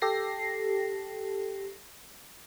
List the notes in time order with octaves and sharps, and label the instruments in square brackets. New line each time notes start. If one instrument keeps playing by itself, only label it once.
[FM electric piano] G4 A4 A#6 C7